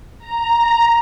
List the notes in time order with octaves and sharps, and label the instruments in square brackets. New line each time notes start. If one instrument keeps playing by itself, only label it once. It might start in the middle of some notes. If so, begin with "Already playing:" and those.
[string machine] A#5